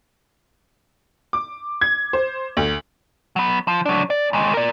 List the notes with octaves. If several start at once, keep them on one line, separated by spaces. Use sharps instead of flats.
D6
G#6
C5
D2
F#3 B3
F3
F#3 D4
D5
D#2 G#3
A#4 D5